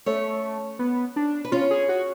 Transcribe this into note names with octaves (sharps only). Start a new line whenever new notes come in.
A3 C#4 C#5
B3
D4
B4
C#4 F4 C#5
G#4
F#4